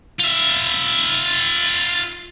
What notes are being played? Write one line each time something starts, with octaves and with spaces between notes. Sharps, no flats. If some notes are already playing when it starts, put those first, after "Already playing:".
F4 E5